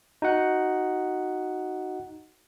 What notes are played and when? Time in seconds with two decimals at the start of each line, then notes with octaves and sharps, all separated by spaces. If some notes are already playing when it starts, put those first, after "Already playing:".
0.22 D#4 F#4 F#5